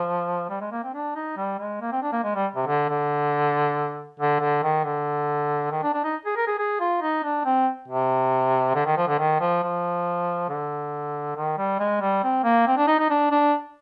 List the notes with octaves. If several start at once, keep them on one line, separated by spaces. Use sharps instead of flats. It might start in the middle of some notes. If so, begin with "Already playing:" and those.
Already playing: F3
G3
G#3
A#3
C4
D4
D#4
G3
G#3
A#3
C4
D4
A#3
G#3
G3
C3
D3
D3
D3
D3
D#3
D3
D#3
D4
D4
D#4
G#4
A#4
G#4
G#4
F4
D#4
D4
C4
C3
D3
D#3
F3
D3
D#3
F3
F3
D3
D#3
G3
G#3
G3
C4
A#3
C4
D4
D#4
D#4
D4
D4